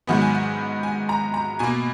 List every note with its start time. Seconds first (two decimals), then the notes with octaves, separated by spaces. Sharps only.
0.07 G#2 D#3 F#3 B3 F#5
0.22 G#5
0.35 F#5
0.83 G#5
1.09 A#5
1.34 A#5
1.59 B2 A#3 G#5